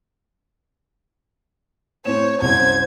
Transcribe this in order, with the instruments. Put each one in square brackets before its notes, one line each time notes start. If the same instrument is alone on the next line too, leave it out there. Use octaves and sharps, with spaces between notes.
[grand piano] A2 C4 E7 [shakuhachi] C5 [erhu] C#5
[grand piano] C2 F#2 [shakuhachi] C5 [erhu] G#6